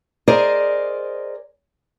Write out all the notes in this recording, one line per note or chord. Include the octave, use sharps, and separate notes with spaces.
G#4 A#4 C5 D5 D#5